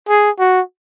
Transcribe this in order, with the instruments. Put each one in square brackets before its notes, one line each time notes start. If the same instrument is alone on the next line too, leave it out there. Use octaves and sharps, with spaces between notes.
[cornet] G#4
F#4